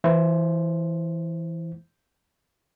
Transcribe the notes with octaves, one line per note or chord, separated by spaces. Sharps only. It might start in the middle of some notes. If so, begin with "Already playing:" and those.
E3 E4 C5